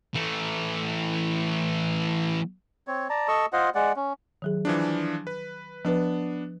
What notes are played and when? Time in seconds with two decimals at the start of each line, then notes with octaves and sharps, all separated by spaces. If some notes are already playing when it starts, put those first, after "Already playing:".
0.15 E3 A3
2.87 C4 C#5
3.10 D5 A5 A#5
3.28 A4 D#5 C#6 E6
3.53 F4 C5 D#5 F#5
3.75 G#3 D5 F#5
3.96 C#4
4.42 D#3 F#3 G#4
4.65 E3 F3 D4
5.27 B4
5.85 F3 B3 D4 B4